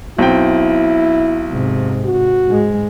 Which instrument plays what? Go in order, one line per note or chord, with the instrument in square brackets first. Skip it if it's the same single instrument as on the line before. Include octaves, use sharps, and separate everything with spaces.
[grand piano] B1 C4 G5 [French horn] E4
[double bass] G#2 C3
[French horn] F#4
[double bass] G#2 G#3